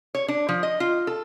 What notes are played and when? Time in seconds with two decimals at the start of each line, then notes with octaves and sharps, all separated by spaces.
0.15 C#5
0.28 D4
0.49 F3
0.63 D#5
0.80 F4
1.07 A4